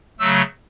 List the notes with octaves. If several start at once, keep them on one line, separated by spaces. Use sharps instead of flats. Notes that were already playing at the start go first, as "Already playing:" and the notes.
C#3 F#3 A3 E6